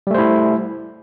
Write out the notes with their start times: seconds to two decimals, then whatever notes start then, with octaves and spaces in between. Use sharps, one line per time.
0.07 G3
0.11 A3
0.14 C5
0.18 E4